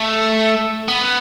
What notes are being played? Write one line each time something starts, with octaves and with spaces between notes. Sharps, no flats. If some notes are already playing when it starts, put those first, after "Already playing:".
Already playing: A3
B3